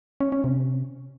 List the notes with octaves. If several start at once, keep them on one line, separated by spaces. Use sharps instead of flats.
C#4
C#4
C3